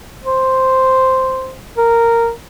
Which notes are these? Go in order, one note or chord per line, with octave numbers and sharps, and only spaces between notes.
C5
A#4